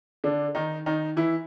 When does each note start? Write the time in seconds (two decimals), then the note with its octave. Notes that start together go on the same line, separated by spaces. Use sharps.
0.24 D3 D4
0.55 D#3 D#4
0.86 D#3 D#4
1.17 E3 E4